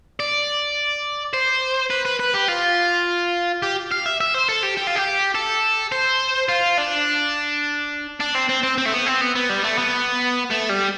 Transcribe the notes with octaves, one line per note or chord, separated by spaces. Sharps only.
D5
C5
B4
B4
B4
G4
F4
G4
F5
E5
E5
C5
A4
G4
G4
F4
G4
A4
C5
F4
D4
D4
C4
C4
C4
C4
A3
B3
C4
B3
B3
G3
A3
B3
A3
G3